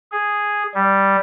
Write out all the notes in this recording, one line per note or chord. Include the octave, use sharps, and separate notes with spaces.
G#4
G3